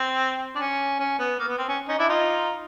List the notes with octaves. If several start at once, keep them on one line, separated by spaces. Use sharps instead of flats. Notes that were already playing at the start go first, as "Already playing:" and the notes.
Already playing: C4
D4
C#4
C#4
B3
A#3
B3
C4
C#4
C#4 D#4
D4 E4
D#4 F4